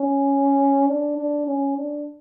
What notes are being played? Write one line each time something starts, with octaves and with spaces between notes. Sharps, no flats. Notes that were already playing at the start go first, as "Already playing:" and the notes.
Already playing: C#4
D4
D4
C#4
D4